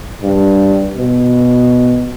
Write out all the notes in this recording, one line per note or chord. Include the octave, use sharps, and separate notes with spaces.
G2
B2